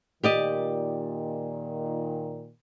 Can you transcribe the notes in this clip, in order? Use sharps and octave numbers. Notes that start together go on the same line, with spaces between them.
A#2 D#3 G4 D5 D#5